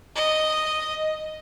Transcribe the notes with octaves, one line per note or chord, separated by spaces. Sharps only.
D#5